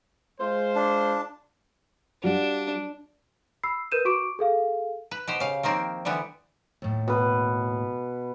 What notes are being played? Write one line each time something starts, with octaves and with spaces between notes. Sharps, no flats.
G#3 F4 C5
D4
G3 D4 F4 F#4
B5 E6 C7
A#4 B4 G6 D#7 E7
F#4 C#6 D6 D7
G#4 A4 F5
B4
B2 G4 C5
C#3 F5
D#3 F3 A#3 C4
D3 E3 G3 B3
D#2 A2
B2 B4